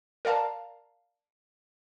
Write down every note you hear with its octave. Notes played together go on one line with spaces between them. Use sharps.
A#4 D5 F5 A5 A#5